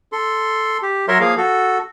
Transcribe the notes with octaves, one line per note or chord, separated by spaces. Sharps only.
A4 C6
G4
F#3 A#4 C#5 E5 C6
F3 A#3 G#4 F5
F#4 A4